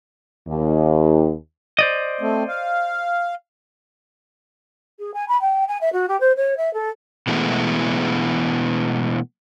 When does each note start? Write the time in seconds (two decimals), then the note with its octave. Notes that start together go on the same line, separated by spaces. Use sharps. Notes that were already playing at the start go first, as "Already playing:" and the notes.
0.48 D#2
1.79 C5 D5 D#5
2.21 A3 C4
2.48 F5
4.99 G#4
5.14 G#5
5.28 B5
5.41 G5
5.68 G#5
5.81 E5
5.93 F#4
6.09 G4
6.20 C5
6.36 C#5
6.57 E5
6.74 A4
7.27 B2 E3 G#3 A3 B3